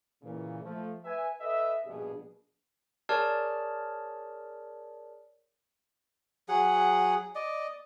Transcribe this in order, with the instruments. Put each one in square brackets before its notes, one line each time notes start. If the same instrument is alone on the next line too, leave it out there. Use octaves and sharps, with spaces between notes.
[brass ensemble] A#2 C#3 E3
F3 A3
B4 E5 G#5
A4 B4 D#5 E5
A#1 G2 B2 D4 G#4
[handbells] G#4 A#4 C#5 D5 A5 F6
[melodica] F#3 G#4 F#5
D5 D#5